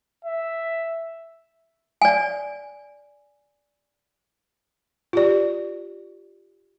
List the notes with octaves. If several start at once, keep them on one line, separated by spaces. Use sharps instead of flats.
E5
D5 G#5
F4 G4 D5